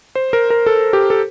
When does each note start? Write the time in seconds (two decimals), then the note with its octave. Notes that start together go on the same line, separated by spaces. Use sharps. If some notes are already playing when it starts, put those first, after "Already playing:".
0.15 C5
0.33 A#4
0.50 A#4
0.66 A4
0.93 G4
1.10 A4